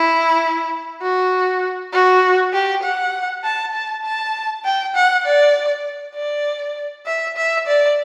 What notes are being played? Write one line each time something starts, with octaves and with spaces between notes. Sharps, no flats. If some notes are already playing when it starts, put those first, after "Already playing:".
Already playing: E4
F#4
F#4
G4
F#5
A5
A5
A5
G5
F#5
D5
D5
E5
E5
D5